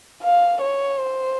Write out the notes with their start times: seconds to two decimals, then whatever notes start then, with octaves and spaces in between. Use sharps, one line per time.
0.23 F5
0.62 C#5
0.99 C5